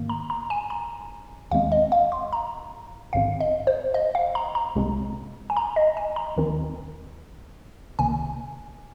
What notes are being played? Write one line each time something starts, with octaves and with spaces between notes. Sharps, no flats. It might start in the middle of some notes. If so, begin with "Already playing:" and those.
Already playing: G#2 D#3 A#3
A#5
A#5
G#5
A#5
D#2 D#3 G#3 C4 F5
D#5
F5
C6
A#5
A#1 G#2 D#3 C4 F5
D#5
C5
D#5
F5
A#5
A#5
C2 C3 G#3 C4
G#5
A#5
D#5
G#5
A#5
D#2 D#3 C4
C2 C3 D#3 A#3 G#5